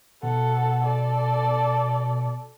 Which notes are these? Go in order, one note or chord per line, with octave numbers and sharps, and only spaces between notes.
B2 A4 F#5
A4 D5